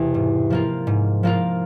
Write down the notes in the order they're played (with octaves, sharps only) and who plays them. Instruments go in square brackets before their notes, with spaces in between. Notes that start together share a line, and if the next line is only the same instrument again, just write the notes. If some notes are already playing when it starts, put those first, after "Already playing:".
Already playing: [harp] E1 E2 C3
G#2
F3 A#3 F4
G#2
F3 A#3 F4